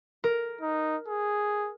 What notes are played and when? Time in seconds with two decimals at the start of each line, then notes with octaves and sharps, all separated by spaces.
0.24 A#4
0.61 D#4
1.08 G#4